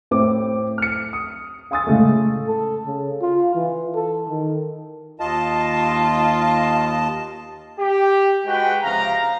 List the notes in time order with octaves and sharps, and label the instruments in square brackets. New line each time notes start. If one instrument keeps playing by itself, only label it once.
[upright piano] A2 C4 D6
F6 C#7
D#6
F5 G#5 C6 D#6 E6 A6
A2 C#3 G#3 A3
[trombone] A4
C#3
F4
E3
A4
D#3
[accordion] D#2 D#5 A5 [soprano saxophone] F4
[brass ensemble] G4
G#3 F#4 B4 G5
C#2 C3 F3 F5 A#5